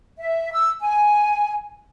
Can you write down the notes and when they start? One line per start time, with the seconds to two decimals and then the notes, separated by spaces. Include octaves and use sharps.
0.17 E5
0.52 E6
0.81 G#5